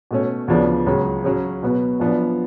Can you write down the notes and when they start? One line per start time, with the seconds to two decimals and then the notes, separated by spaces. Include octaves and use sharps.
0.11 B2 A3 C#4
0.48 D2 C#3 F3 B3 D4
0.86 C#2 C#3 F#3
1.24 C#3 F#3 C#4
1.63 B2 F#3 B3
2.00 F#2 F3 B3 D4